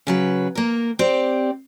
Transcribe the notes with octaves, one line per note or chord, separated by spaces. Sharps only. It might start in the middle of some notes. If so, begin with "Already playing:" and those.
C#3 F#3 B4
A#3 A#4
C4 G4 D5